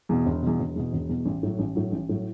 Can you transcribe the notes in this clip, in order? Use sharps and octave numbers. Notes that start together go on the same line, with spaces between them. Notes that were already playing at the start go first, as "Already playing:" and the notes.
E2 B2
E1
E2 B2
E1
E2 B2
E1
E2 B2
A1
A2 F#3
A1
A2 F#3
A1
A2 F#3